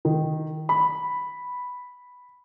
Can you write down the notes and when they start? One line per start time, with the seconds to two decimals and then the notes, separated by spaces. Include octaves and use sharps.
0.05 D#3
0.69 B5